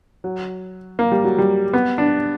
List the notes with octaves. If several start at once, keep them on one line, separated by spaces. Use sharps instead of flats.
F#3
A#3
G3
F#3
G3
B3
D4